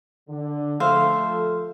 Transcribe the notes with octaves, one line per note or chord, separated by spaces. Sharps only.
D3
F3 A3 A4 C5 E5 F5